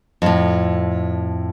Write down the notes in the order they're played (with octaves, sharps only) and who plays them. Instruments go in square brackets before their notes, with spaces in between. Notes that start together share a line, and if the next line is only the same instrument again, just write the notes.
[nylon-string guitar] F2 A2